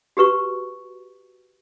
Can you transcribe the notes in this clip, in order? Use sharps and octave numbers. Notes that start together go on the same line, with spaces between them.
F#4 G4 B4 C#6